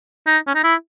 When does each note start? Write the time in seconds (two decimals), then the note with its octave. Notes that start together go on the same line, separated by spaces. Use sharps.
0.26 D#4
0.47 C#4
0.55 D#4
0.63 E4